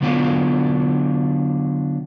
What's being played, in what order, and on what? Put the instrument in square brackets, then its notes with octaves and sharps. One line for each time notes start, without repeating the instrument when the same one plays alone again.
[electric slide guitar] D3 F#3 B3 D4 E4 F4